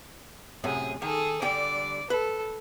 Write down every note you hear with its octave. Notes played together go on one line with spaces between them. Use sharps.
F#2 A2 C3 G#4
D#3 G#4 A4
D3 G3 D5 G5
A4 B4